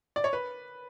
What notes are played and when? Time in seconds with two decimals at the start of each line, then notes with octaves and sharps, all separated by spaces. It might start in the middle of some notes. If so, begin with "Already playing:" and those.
0.16 D5
0.24 C#5
0.33 B4